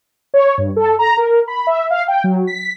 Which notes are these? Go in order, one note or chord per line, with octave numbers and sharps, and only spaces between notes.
C#5
G2
A4
A#5
A#4
B5
E5
F5
G5
F#3
B6